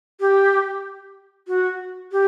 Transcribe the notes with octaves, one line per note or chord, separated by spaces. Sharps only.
G4
F#4
G4